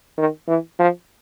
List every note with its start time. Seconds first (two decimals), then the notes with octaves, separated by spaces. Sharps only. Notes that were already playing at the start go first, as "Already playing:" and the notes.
0.18 D#3
0.48 E3
0.79 F3